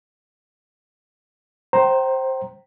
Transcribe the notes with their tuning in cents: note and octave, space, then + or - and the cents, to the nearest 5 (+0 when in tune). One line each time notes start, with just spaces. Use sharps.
C5 +15 G5 -25 A#5 +0